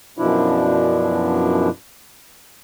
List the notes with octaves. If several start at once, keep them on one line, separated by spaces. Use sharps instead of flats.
F#2 B2 F3 D4 E4